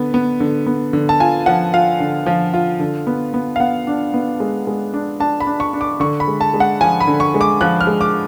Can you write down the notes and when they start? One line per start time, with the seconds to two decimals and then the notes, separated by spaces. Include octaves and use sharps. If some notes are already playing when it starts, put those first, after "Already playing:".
Already playing: D3 B3
0.14 B3
0.40 D3
0.66 B3
0.93 D3
1.09 A5
1.20 F4 G#5
1.46 F3 F#5
1.74 F4 F5
2.00 D3
2.26 F3
2.54 F4
2.80 D3
3.07 B3
3.34 B3
3.56 F5
3.60 B3 F#5
3.87 D4
4.14 B3
4.40 G#3
4.67 G#3
4.94 D4
5.20 D4 A5
5.40 B5
5.47 D4
5.60 C#6
5.73 D4
5.81 D6
6.00 D3 C#6
6.20 B5
6.27 G#3
6.41 A5
6.54 G#3
6.60 F#5
6.81 F3 G#5
7.01 B5
7.07 D3
7.20 C#6
7.34 G#3
7.41 D6
7.61 F3 F#6
7.81 F6
7.87 G#3
8.01 D6